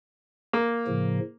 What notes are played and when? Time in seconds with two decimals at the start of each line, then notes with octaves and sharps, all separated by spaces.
0.53 A#3
0.87 A2 C#3 F3